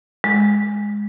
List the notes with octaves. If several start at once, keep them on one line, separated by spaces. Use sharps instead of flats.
G#3